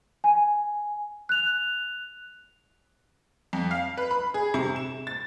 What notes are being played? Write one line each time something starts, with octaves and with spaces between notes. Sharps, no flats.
G#5
F#6 F7
F2
F5
B4
B5
G#4
C3
E7
A6